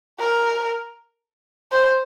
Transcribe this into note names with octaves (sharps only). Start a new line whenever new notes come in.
A#4
C5